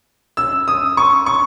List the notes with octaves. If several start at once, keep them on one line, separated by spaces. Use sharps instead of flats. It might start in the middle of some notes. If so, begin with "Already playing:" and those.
E6
D#6
C#6
C#6